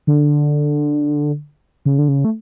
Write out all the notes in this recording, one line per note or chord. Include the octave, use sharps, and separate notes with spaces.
D3
C#3
D3
C#3
A3